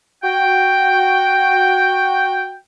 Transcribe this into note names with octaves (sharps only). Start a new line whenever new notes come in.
F#4 G5